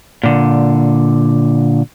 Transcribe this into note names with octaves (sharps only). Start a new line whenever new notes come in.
A#2 D3